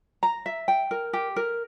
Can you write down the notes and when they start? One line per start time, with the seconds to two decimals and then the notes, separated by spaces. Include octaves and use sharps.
0.23 A#5
0.46 E5
0.68 G5
0.91 A#4
1.13 G4
1.36 A#4